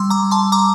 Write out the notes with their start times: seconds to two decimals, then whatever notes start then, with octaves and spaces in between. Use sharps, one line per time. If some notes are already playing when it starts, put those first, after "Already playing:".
Already playing: G3 C6 D6 E6
0.10 A#5 D6
0.31 A5 C6
0.52 A#5 D6